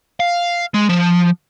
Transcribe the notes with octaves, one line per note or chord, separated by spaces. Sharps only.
F5
G#3
F3